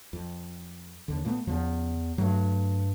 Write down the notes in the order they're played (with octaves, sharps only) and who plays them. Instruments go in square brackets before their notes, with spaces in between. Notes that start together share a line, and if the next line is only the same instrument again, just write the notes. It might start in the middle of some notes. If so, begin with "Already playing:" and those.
[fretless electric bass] F2
D#2 D3
A#2 A3 B3
[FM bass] E2 [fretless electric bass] C#3 F3
[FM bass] G2 [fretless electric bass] F#3 A3